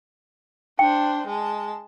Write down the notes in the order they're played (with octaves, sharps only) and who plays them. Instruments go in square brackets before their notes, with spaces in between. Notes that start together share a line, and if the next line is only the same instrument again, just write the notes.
[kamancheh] D4 C5 [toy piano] G5
[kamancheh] G#3 A5